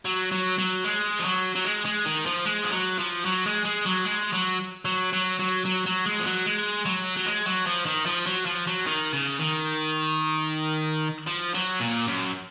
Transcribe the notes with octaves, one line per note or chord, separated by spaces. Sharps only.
F#3
F#3
F#3
G#3
F3
F#3
F#3
G#3
G#3
D#3
F3
G#3
F3
F#3
F3
F#3
G#3
G#3
F#3
G#3
F#3
F#3
F#3
F#3
F#3
F#3
G#3
F3
F#3
G#3
F#3
F#3
G#3
F#3
F3
D#3
F3
F#3
F3
F#3
D#3
C#3
D#3
F3
F#3
A#2
F#2